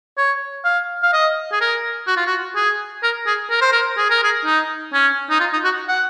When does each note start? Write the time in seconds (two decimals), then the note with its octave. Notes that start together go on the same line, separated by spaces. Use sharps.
0.18 C#5
0.65 F5
1.03 F5
1.13 D#5
1.52 G#4
1.61 A#4
2.07 F#4
2.17 F4
2.27 F#4
2.56 G#4
3.03 A#4
3.27 G#4
3.50 A#4
3.61 C5
3.72 A#4
3.97 G#4
4.10 A#4
4.24 G#4
4.45 D#4
4.93 C#4
5.30 D#4
5.40 F4
5.53 D#4
5.64 F#4
5.88 F#5